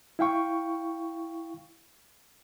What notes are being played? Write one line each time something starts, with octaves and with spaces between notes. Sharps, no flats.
E4 F5 G5 C#6